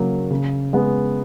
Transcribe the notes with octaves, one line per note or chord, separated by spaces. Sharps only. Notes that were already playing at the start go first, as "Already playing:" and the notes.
Already playing: C#3 F#3 A#3
C#3
G#3 B3